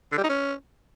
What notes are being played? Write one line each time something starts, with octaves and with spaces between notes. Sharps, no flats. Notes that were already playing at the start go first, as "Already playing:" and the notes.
D3
G3
D#4
C#4